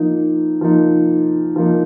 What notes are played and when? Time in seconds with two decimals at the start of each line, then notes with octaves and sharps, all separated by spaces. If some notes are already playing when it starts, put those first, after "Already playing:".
Already playing: F3 A#3 D#4
0.61 F3 A#3 D#4
1.56 F3 A#3 D#4